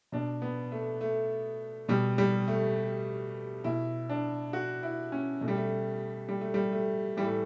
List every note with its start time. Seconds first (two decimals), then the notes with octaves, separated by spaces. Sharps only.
0.12 B2 D4
0.42 B3
0.72 A3
1.01 A3
1.89 B2 G3
2.18 G3
2.48 A3
3.64 B2 E4
4.09 D4
4.53 F#4
4.83 E4
5.12 C#4
5.41 B2 A3
5.48 G3
5.56 A3
6.29 G3
6.41 A3
6.54 G3
6.72 A3
7.17 A2 E3 G3
7.24 A3